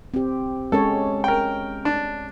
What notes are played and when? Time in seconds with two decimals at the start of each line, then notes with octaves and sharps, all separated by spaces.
0.14 C4 G4
0.72 G#3 C#4 A4 C#5
1.24 A#4 G5
1.85 D4